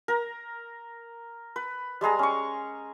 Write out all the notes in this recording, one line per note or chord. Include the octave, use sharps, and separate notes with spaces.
A#4 A#5
B4
G3 G#3 G#4 A#5
C#4 C#6